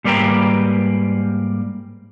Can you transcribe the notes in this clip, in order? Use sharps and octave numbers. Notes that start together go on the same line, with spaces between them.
G#2 G3 A#3 B4 G5 A#5